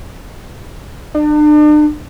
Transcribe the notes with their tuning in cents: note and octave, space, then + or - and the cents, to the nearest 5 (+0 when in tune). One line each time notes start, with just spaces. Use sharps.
D4 +40